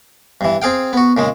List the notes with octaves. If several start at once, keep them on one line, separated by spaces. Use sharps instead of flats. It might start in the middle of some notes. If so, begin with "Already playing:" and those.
G2 E3
C4 G#4 F5 G5
B3 F#4
A#2 C#3 G#3